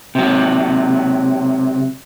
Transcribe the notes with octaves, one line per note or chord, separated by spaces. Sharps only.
C3 F#3